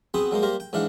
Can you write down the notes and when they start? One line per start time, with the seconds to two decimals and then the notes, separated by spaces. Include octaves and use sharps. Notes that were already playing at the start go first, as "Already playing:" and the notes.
0.14 B3 C4 F#4 G#4 B4 C5
0.31 F#3 G#3 A#3 C5
0.43 G3 A#3 A#4 C5 A#5
0.60 G5
0.73 G#2 E3 D4 F5 F#5